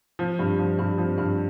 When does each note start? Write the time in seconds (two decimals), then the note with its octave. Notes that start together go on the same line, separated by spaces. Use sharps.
0.19 F3
0.39 G2
0.59 F3
0.79 G2
0.98 F3
1.18 G2